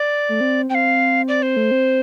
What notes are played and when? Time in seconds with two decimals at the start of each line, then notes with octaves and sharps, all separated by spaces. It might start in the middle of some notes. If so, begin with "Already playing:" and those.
Already playing: D5
0.29 A3
0.41 C4
0.70 C4 F5 G5
1.28 D5
1.42 C5
1.57 A3
1.71 C4